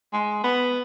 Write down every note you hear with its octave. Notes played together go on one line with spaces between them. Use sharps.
G#3
B3